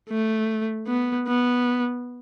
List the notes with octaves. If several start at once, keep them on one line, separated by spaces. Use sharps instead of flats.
A3
B3
B3